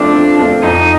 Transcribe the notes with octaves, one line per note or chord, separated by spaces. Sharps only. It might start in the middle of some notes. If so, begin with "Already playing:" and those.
Already playing: F3 A3 C4 D4 F4
F3
A3 C4 F4
F2 D#4